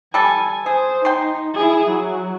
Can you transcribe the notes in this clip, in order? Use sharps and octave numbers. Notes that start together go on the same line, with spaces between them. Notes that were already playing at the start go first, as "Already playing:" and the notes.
G3 A4 G#5
G#4 C5
D#4 G5 C6
E4 G#4
F#3